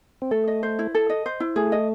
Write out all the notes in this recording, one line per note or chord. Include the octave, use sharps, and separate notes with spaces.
C4
A3 A4
D#5
C5
E4
A4
D#5
C5
E4
A3 G#4
D#5